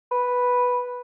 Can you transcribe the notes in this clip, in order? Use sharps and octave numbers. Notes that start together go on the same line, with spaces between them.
B4